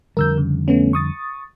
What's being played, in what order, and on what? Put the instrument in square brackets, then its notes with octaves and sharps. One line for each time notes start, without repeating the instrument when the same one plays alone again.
[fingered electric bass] F2 D3 G3 [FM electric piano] A#4 E6 G6
[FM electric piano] C#3
A3 B3 C#4
C#6 D#6 A6